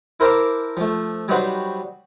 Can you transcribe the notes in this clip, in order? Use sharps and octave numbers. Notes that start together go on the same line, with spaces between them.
E4 A#4 C5 A5 A#5 D6
F3 A3
F#3 G3 D#4 F#4 B4 C5